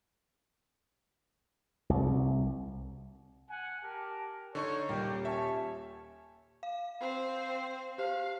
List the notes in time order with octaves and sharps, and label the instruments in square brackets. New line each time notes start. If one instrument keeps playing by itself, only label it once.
[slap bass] C2
[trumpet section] F#5 G#5
G4 A#4 A5
[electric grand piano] D3 D#4 C#6 [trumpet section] C#5
[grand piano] D#1 [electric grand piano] G3 [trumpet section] A#3 G4
[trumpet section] C#4 C#5 A5 [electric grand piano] E5
[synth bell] F5
[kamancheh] C4 C5
[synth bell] G4 C5 [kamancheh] F5